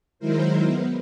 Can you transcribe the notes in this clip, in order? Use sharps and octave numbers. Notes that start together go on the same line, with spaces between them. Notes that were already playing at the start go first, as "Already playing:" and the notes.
D#3 F#3 G#3 E4 A#4 C5
B3